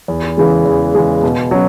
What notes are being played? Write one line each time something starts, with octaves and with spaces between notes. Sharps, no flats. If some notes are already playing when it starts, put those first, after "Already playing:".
E2
C#3 E3 G#3
E2
C#3 E3 G#3
B2
F#3 C#4